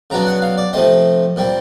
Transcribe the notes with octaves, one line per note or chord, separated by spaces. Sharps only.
C#3 F#3 B3 D4 A#5
F#5
F5
D5
C3 F3 A3 C4 D#5
A#2 G3 C4